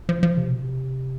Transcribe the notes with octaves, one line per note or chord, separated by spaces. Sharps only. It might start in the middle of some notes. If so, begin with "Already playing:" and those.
F3
F3
C3
B2
C3